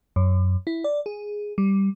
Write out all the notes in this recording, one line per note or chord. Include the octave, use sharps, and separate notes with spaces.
F#2
E4
D5
G#4
G3